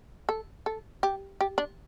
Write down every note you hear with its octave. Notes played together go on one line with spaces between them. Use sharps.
A4
A4
G4
G4
D4